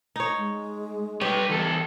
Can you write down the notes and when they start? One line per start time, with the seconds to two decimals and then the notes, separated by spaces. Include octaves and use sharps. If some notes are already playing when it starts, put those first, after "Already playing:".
0.16 D#4 C#5
0.37 G#3
1.21 G3 G4 B4 C#5
1.49 E2 A4